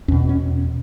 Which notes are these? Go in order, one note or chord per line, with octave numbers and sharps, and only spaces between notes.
E2 B2 C#4
C#4